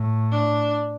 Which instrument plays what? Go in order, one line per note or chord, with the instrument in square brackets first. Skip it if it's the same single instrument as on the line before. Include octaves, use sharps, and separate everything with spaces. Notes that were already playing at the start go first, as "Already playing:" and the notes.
Already playing: [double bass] A2
[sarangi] D4